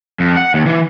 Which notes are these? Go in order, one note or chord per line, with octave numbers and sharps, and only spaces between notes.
F2
F#5
D#2
E3